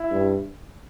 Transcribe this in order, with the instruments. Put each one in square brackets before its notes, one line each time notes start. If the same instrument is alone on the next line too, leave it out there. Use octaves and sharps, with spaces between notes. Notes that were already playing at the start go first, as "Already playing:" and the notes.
Already playing: [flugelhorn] E4
[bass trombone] G2